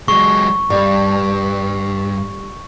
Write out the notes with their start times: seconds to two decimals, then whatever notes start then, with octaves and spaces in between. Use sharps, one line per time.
0.08 F#3 G#3 C#6
0.70 G2 G3